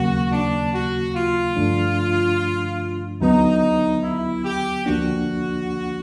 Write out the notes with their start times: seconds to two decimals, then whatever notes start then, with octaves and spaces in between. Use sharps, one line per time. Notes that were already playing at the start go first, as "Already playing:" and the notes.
Already playing: D#2 C#3 F#3 A#3 F#4
0.32 D4
0.74 F#4
1.15 F4
1.56 G2 D3 F3 A3 D4
3.21 D2 D3 F#3 B3 D#4
4.03 E4
4.45 G4
4.86 D2 D3 F3 A#3 D4 F#4